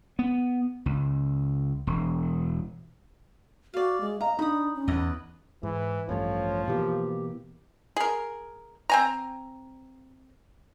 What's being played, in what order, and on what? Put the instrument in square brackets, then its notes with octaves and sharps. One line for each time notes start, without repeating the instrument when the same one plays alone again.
[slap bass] B3
C#2
E1
[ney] F#4 [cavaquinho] D5 F5
[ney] G#3
[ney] D#5 [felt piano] F5 [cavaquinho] A#5
[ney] D4 [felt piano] D#4 [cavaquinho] B5 D#6
[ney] C#4
[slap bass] E2 [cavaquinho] B4 D#5
[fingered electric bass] G#2 [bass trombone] E3
[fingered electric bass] A1 G2 A3 [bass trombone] F3 [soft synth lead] C#5
[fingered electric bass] B2 E3 A#3 [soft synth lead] G4
[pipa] G#4 A#4
C4 G#5 A#5